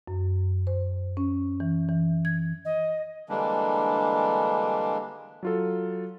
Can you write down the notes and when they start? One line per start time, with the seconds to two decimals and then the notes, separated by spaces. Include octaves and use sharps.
0.08 F#2
0.67 C5
1.17 C#4
1.60 E3
1.89 E3
2.25 G#6
2.65 D#5
3.29 D3 E3 G3 G#3 A#3 D4
5.43 F#3 F4 A4